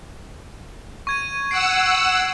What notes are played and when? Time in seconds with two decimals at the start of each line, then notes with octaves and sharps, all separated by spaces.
1.07 C#6 G#6 D#7
1.51 F#5 E6 C7 D7